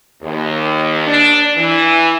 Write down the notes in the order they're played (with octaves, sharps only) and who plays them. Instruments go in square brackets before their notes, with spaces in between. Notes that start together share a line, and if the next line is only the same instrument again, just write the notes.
[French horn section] D#2
D4
E3